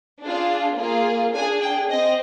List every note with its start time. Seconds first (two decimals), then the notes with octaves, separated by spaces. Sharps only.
0.22 D4 F4 G#4
0.77 A#3 F4 G#4
1.34 D4 G#4 G#5
1.62 G5
1.90 C4 D#5